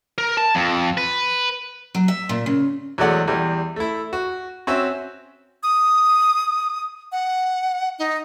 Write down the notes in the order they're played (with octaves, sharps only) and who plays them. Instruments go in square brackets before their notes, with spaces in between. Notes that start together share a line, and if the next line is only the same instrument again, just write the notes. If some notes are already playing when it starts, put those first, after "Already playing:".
[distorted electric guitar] A#4
A5
F2
B4
[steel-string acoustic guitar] F#3
E5
A#2
C#3
[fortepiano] E2 F#3 G#3 A3 D5 F#5
E2 G3
A3 E4
F#4
C4 C#4 F#4 E5
[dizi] D#6
F#5
D#4